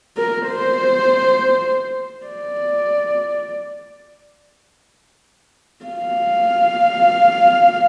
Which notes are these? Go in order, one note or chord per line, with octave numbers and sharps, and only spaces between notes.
A#4
C5
D5
F5